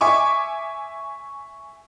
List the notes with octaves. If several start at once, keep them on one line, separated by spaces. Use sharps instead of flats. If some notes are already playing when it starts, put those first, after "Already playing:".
E5 G#5 C#6 D6